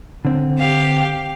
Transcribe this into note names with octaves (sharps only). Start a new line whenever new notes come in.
D3 C4
G4 F5